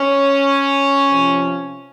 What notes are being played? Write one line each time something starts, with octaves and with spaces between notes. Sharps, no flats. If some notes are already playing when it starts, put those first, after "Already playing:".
Already playing: C#4
C3 F3